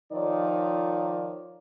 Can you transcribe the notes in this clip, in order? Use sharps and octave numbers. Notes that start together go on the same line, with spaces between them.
D#3 F3 D#4 C#5 D5